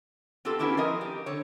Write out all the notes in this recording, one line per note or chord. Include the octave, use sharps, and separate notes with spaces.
B3 C4 F4 G4 A4
B3 C#4 D4 E4 F#4 G4
F3 C4 A#4 D#5
G4
D3 C#5